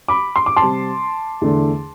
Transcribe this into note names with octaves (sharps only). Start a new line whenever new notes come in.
B5 D6
C6
D6
A5 C6
C3 G3 C4
E2 D3 A3 D4